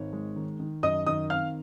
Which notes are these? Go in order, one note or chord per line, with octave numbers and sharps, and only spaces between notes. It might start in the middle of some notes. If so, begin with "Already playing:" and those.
Already playing: G#1 C#5
G#3
D#3
D#3
F#2 D#5 D#6
D#3 D#5 D#6
C4 F5 F6